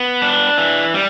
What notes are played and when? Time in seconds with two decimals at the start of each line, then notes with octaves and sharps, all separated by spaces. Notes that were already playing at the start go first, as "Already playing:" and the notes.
Already playing: B3
0.22 D4
0.58 E3
0.94 G3